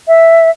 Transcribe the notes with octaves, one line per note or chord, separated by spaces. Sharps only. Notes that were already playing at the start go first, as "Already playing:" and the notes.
E5